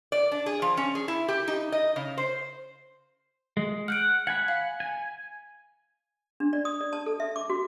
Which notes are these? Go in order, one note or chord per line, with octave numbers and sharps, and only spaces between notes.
D5
D4
G#4
F3
C#4
G#4
E4
G4
D#4
D#5
C#3
C5
G#3
F#5 F6 G6 D7
F#5 G#5 B5 G#6
F5
G#5
D4
D5
D#6
D5
A5
A4
E5
D6
F#4